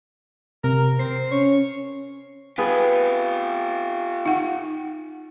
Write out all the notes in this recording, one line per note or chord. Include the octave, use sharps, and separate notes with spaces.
C3 A#4
C4 C7
C#4 C#5
B3 F4 G4 G#4 B4
D#4 F#5